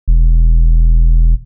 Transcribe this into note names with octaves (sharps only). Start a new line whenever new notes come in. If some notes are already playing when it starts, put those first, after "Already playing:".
E1